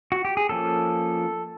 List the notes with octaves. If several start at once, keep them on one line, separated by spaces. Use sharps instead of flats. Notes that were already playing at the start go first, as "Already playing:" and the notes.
F#4
G4
G#4
F3 A#3 C#4 A4